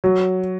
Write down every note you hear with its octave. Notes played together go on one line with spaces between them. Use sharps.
F#3